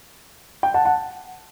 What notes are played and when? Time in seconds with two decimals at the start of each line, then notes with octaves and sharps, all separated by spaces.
0.63 G5
0.74 F#5 A5
0.85 F#5 A5